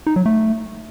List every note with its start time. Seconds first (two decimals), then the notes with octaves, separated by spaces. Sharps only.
0.07 D#4
0.16 F#3
0.26 A3